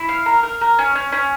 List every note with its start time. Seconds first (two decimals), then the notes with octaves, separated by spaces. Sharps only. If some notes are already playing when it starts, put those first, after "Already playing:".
Already playing: E4
0.08 F5
0.26 A#4
0.43 A#4
0.61 A#4
0.79 C#4
0.95 C#4
1.12 C#4